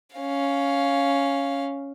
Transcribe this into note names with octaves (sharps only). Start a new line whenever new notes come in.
C#4 F5